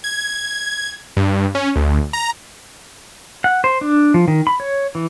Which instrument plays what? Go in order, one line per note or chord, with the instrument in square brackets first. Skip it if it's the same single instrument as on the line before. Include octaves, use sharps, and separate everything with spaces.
[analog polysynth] G#6
G2
C#4
D2
A#5
[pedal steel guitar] F#5
C5
D4
F3
D#3
B5
C#5
E3